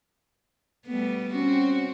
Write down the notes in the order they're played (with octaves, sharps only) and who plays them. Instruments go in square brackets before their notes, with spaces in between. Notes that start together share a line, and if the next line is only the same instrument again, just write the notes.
[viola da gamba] G3 A3 B3
[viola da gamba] C4 F#4 [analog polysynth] C#4